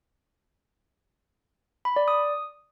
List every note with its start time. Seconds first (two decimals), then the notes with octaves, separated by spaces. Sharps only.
1.85 B5
1.96 D5
2.08 D#6